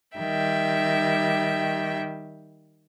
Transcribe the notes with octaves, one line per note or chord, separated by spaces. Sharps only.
D#3 G3 E5 G5